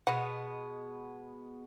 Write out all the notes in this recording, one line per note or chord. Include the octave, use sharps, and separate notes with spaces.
B2 G#3 B3 D#5 F#5